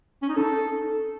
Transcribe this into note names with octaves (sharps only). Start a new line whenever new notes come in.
C#4
D#4
A4